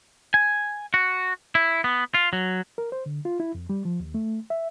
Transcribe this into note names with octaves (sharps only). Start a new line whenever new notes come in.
G#5
F#4
E4
B3
F4
F#3
A#4
C5
D3
F4
E4
F2
G3
F3
D#2
A3
E5